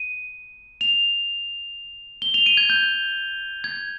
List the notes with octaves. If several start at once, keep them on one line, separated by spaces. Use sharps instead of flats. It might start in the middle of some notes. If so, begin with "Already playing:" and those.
Already playing: D#7
F7
G7
F7
D#7
G#6
G6
G#6